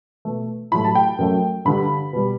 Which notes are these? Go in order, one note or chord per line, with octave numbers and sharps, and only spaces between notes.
B2 A3
A2 F#3 A3 B5
A5
G5
F#2 F#3 A3
G2 D3 G3 B5
B2 G3